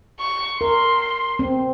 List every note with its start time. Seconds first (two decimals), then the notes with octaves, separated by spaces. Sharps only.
0.19 C#6
0.61 A#4 C6
1.39 C4